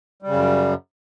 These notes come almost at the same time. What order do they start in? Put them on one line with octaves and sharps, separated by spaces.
G3 C#3 F#2